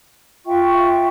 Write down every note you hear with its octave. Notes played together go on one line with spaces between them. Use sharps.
F4 E5 G5 C#6